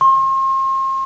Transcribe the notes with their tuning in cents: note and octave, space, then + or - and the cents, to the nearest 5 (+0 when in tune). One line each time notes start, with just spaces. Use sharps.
C6 +40